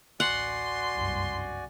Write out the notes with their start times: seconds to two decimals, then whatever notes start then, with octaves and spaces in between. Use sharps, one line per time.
0.20 A1 D2 F#4 D5 F#5 G#5 C6
0.94 F#1 C2 G2